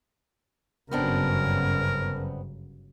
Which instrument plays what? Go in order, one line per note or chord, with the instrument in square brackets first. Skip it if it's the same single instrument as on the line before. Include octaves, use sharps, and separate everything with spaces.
[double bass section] G1 F#2 [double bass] C#3 [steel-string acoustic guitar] B3 C4 D4 [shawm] A#4